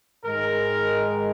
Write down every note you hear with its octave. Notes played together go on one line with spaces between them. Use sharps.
G#2 D#3 G#3 A#4